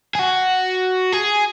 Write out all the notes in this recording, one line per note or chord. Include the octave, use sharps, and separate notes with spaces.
G#4
F#4
G#4